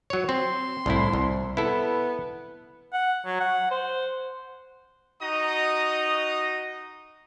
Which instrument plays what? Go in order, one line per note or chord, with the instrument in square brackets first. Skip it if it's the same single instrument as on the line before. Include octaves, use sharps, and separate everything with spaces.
[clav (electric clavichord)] F#3 C#5
[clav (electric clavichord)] C4 [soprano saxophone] C6
[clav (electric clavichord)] C2 A2 E4
C2
[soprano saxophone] B3 [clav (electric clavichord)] E4 A4
[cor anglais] F#5
F#3
F#5
C5
[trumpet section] D#4 F#4 D#5 A#5 D#6